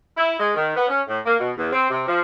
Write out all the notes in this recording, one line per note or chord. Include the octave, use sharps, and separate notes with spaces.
E4
G#3
D#3
B3
C#4
A2
A#3
B2
E2
C4
C3
F3